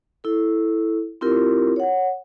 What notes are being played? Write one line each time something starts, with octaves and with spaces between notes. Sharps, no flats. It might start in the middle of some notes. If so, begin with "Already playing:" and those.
E4 A4
C4 E4 F4 G4 A#4
C#5 F#5